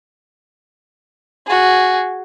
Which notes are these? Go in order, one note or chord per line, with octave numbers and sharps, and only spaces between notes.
F#4 G#4